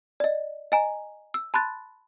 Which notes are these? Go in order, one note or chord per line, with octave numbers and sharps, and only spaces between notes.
D5 D#5
D#5 G#5 A#5
E6
A5 B5 C6 F#6 A6